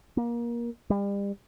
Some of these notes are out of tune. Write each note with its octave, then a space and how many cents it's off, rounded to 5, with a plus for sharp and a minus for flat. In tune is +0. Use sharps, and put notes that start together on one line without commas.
A#3 +25
G3 +35